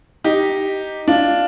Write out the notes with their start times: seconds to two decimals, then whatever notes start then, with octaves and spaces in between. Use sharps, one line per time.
0.24 D#4 G4
1.08 D4 F4